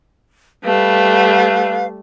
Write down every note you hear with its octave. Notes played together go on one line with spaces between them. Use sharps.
G3 A3 B4 F5